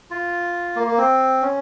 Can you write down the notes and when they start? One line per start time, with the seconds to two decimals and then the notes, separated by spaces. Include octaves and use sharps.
0.11 F4
0.76 A#3
0.87 A#3
0.98 C4
1.42 C#4